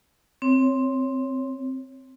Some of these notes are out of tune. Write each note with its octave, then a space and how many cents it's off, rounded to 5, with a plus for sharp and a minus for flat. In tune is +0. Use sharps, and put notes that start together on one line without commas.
C4 +0 C#5 +0